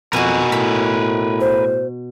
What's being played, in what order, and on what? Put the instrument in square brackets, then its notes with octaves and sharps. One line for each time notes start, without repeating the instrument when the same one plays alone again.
[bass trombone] F2 [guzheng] B2 F#4 [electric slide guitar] A#4 B4 G#5
[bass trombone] A2 [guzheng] B5
[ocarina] C5